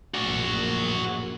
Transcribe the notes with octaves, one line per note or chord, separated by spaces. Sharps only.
A#1 F#2 A2 F#4 D5